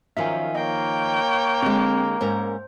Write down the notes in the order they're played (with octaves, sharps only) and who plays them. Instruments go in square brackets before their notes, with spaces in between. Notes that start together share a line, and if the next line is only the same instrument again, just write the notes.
[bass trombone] F#2 [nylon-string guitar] D#3 F3 D#4 [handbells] E5 F5 G#5
[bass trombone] A#3 [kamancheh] C#5 G5 [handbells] D#5 F5
[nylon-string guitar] D3 G#3 [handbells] C4
[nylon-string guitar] G#2 C#4 A#4 [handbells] C5